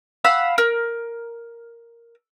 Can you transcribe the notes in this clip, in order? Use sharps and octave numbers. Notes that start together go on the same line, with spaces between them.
F5 F#5 B5 E6
A#4